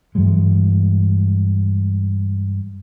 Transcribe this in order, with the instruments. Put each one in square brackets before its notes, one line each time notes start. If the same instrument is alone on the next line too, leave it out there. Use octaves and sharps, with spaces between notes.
[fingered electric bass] G2 E3 F#3 G#3